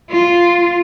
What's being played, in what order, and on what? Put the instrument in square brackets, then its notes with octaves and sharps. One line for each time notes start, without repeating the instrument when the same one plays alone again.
[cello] F4